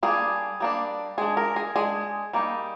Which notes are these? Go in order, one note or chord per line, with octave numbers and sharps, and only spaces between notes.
G3 A#3 D4 G#4
G3 A#3 D4
G#3 D4 G#4
A#4
G#4
G#3 D4 G#4
G3 A#3 D#4